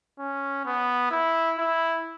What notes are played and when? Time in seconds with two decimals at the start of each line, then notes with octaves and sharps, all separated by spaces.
0.19 C#4
0.65 B3
1.11 E4
1.58 E4